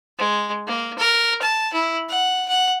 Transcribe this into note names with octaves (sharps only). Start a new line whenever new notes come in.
G#3
A#3
A#4
A5
E4
F#5
F#5